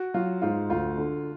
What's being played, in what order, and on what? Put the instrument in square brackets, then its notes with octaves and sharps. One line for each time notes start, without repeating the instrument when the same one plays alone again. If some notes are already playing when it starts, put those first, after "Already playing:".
Already playing: [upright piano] F#4
[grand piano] F#3 [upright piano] F4
[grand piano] G#2 [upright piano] F4
[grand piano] D2 [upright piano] F4
[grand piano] D3